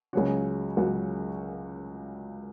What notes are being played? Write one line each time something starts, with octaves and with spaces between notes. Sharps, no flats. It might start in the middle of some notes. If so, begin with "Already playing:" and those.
C#2 C#3 F#3 C#4 F#4
C#2 C#3 F#3 C#4 F#4